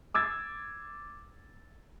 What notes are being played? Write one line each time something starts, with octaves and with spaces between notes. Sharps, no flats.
D6 E6 G#6 A6